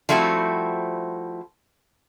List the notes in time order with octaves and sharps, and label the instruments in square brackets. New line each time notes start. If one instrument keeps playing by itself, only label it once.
[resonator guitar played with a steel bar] F3 G3 A3 C4 E4 F#4